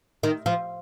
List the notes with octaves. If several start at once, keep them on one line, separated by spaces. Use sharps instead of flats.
D#3
F3